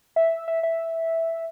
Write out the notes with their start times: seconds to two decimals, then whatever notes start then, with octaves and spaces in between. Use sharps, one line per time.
0.16 E5
0.48 E5
0.63 E5